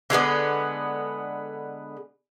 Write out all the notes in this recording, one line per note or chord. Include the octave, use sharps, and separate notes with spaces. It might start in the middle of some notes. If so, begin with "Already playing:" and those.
D3 G#3 A3 B3